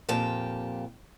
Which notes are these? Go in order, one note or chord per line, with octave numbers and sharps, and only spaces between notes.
F2 A#2 G4 G5 A5